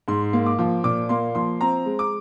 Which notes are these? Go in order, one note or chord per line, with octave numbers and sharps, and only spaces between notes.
G#2 C6
A#3
D6
F3
A#2 D6
A#3 C6
F3 C6
C4 A#5
G#3
D6